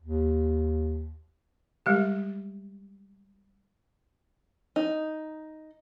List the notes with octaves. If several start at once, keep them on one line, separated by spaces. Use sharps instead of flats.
D#2
G3 G#3 G4
D#4